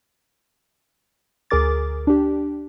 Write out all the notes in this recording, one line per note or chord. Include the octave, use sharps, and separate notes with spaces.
D2 G#4 A#4 D6 A6
D4 G4